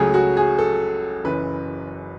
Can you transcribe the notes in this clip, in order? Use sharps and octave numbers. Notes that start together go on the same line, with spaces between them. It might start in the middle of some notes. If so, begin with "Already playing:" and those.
Already playing: C#2 C#3 F#3 A3 G#4
F#4
G#4
A4
F#1 F#2 E3 B4